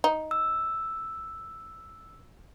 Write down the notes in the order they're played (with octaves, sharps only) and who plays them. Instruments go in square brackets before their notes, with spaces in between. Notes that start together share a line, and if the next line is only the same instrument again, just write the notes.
[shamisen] D#4
[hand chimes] E6